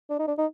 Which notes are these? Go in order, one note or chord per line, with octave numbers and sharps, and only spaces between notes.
D4
D#4
D4
D#4